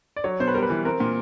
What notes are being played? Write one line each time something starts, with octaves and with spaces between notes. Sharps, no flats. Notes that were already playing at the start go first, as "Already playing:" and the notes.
D5
F#3 C#5
B2 C5
B4
G3 A#4
B4
E3
C4 A#4
A#2